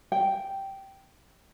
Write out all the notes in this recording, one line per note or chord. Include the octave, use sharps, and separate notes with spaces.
G5